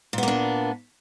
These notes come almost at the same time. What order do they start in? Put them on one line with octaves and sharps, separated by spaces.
A#2 B3 A#3 D4